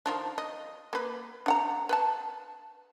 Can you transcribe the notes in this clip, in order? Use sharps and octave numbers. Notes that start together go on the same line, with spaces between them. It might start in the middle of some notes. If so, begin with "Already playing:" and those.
D#3 F3 D4
D#5
A#3 B4
D4 F#5 A#5
B4 G5 A5